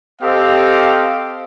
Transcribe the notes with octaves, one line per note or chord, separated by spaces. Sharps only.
C4 G4 A4 D#5 F5